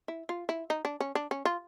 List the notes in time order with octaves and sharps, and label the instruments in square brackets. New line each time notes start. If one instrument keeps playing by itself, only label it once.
[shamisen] E4
F4
E4
D#4
D4
C#4
D4
C#4
F4